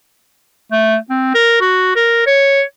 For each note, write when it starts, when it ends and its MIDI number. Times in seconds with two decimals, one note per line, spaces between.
0.72 0.96 57
1.10 1.31 60
1.35 1.57 70
1.61 1.92 66
1.95 2.24 70
2.27 2.62 73